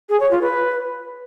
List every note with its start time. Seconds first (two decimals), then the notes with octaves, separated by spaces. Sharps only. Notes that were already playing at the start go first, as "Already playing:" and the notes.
0.09 G#4
0.20 C#5
0.31 F4
0.41 B4